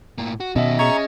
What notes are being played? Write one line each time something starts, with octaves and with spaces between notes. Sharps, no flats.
A2 A#3
F#4
B2 D#3 C#4 D#5 E5
C#4 G#4 D#5 A#5 C#6 G#6